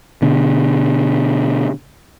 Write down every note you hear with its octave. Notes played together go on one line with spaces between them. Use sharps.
B2 D3